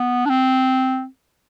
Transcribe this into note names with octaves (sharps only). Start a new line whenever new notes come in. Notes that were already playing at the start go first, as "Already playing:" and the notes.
Already playing: B3
D4
C4